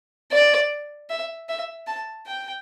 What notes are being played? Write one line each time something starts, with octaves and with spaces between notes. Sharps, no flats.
D5
E5
E5
A5
G5